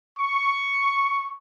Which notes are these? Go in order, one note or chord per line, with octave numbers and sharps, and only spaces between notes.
C#6